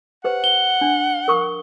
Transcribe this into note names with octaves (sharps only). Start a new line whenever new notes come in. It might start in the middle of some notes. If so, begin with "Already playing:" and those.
G4 B4 C5 F#5
G7
D4
A#4 C#6 D#6